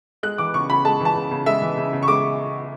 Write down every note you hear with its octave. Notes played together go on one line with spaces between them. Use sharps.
G#3 F#6
E3 D6
C#3 C#6
C#3 B5
G#3 A5
E3
A5
C#3
C#3
G#3 E5
E3
C#3
C#3
C#6
G#3 D6